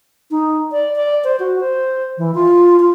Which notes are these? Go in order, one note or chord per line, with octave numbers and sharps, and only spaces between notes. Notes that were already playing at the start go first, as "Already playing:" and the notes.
D#4
D5
D5
C5
F#4
C5
E3
F4
F4